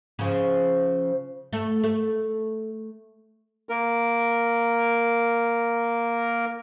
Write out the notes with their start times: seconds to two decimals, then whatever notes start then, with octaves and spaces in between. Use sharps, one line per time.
0.19 C#3 F3
1.53 A3
1.84 A3
3.69 A#3 A#4